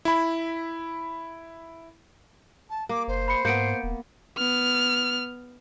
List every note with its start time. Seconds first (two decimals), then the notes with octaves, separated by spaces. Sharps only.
0.05 E4 B5
2.69 A5
2.89 A#3 D6
3.08 F#1 C5
3.28 B5 C#7
3.45 G#2 A#3 B3 G6 C#7 D7
3.83 D#1
4.38 B3 F6